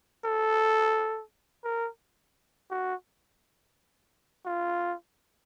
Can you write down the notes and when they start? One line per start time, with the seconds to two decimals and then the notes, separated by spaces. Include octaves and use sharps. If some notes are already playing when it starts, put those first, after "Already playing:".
0.24 A4
1.64 A#4
2.70 F#4
4.45 F4